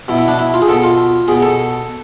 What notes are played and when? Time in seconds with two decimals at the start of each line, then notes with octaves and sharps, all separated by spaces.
0.08 B2 E4
0.18 E4
0.28 D4
0.39 E4
0.54 F4
0.62 G#4
0.68 B2 A4
0.84 F4
1.28 B2 G#4
1.43 A4